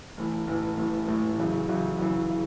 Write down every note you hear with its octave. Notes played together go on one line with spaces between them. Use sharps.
A1 A2 E3
A1 A2 E3
A1 A2 E3
A1 A2 E3
F#2 C#3 E3
F#2 C#3 E3
F#2 C#3 E3
C#3